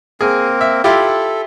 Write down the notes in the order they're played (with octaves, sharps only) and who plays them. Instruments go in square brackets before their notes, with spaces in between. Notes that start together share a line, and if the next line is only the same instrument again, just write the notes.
[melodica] A#3 C4 A#4 [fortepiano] G#4
[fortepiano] E5
[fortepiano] E4 F4 G4 [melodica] A4